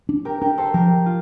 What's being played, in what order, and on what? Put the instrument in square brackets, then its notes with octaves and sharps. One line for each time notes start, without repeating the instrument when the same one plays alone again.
[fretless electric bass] D4
[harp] G4 A#4
[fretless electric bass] D4 [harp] G4 A#4
[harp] A4 C5
[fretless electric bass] F3 [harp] G4 A#4
[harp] F4